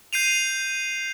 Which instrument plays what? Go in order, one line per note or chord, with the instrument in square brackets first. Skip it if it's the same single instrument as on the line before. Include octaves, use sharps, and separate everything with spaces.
[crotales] G6 C7 D#7 F7